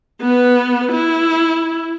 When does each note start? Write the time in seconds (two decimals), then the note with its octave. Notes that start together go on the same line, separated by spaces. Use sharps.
0.21 B3 B4
0.92 E4